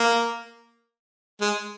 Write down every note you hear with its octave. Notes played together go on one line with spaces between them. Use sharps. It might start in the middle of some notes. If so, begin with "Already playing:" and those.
Already playing: A#3
G#3